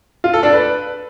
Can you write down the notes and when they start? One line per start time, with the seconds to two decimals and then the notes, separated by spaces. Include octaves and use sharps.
0.24 F4
0.34 A4
0.43 D4
0.53 B4